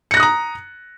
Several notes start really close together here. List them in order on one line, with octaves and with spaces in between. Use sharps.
C#7 A#6 F#6 D#6 A#5